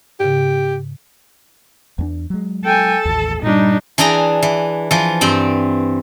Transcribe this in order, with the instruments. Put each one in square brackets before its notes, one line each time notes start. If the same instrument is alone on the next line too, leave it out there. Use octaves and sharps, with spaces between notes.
[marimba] G#2 C#3 [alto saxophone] G4
[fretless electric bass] E2 A#3 D4
F#3 G#3
[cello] A4 [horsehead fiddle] G5 G#5
[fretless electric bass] A1 D#2 [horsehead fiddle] A5
[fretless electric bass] G2 A#2 [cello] G3 [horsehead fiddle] D4 D#4
[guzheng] E3 D4 G#4 G5 A#5
E3
E3 F3
G2 C4 G5